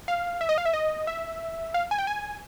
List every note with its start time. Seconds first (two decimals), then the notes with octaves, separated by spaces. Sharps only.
0.08 F5
0.41 E5
0.49 D#5
0.58 F5
0.66 E5
0.73 D#5
1.07 E5
1.74 F5
1.91 G#5
1.99 G5
2.07 G#5